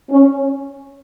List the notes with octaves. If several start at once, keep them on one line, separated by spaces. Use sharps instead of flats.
C#4